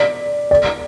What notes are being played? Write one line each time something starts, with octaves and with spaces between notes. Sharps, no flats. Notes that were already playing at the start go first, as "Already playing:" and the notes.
Already playing: D5
D5